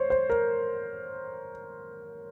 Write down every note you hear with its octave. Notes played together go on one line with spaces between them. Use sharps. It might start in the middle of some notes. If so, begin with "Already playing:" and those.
Already playing: C5 C#5
C5
A#4